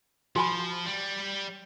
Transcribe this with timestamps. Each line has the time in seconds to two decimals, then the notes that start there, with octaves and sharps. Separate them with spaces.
0.36 F3 F#4 G#5 B5
0.86 G3